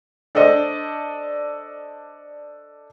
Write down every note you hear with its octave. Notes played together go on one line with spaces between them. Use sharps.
D4 A4 C5 D5 D#5